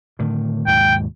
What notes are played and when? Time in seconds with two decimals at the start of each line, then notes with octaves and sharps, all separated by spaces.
0.19 A2 D3 D#3
0.67 D#2 G#2 B2 G5